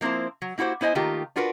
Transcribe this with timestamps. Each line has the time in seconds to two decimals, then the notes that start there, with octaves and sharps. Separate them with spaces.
0.01 F3 A#3 C4 E4 C5
0.42 F#3
0.58 A#3 E4 F#4 G4 C5
0.81 B3 E4 C5 D#5 G#5
0.95 D#3 A3 A#3 F4 G4 A#4
1.36 D4 F4 F#4 A#4 B4